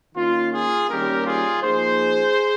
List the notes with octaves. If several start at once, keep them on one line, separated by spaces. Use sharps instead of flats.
D#3 A#3 C#4 F4
F4 G#4
D#3 G3 A#3 C#4 G4 A#4
F4 G#4
F3 A#3 D#4 G#4 C5